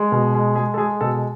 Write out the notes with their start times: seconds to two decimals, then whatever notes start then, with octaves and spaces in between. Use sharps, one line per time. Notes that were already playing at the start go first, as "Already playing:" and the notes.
Already playing: G#3
0.12 B2
0.34 G#3
0.56 G#3 G#4
0.74 A4
0.78 G#3 G#4
1.01 B2 A4